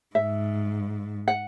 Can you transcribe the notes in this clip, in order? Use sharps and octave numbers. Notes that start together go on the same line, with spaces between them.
G#2 E5
F#5